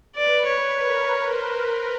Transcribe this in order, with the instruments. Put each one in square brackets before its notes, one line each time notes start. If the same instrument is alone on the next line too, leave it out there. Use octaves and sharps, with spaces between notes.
[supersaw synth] B4 [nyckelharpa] D5
[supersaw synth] B4 [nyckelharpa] C#5
[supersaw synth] A#4
[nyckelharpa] C5